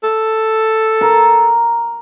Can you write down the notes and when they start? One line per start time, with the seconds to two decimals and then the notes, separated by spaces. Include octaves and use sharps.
0.03 A4
1.01 A#4